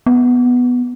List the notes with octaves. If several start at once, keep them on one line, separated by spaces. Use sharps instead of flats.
B3